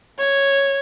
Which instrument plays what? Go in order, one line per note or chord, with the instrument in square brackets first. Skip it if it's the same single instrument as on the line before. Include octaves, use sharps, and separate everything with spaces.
[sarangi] C#5